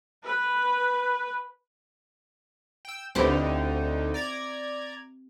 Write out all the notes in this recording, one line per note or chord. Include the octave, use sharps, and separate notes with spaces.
B4
G5 E6
D2 D3 C4 D#4 E4 G4
D5 A#5 G#6